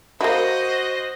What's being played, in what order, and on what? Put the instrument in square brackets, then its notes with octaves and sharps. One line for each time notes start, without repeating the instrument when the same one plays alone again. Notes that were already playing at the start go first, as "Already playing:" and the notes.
[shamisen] A#3 E4 [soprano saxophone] F#4 [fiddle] C5 D#5